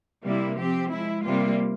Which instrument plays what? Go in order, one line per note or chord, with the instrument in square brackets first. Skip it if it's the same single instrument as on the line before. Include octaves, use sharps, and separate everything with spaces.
[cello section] C3 G3 A#3 E4
F3 C4 G4
F3 G#3 E4
C3 G3 A#3 F4